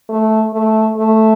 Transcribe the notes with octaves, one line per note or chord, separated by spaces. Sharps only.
A3
A3
A3